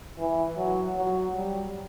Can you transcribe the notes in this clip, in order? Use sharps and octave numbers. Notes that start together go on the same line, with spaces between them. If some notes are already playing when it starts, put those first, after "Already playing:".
E3
F#3
F#3
G3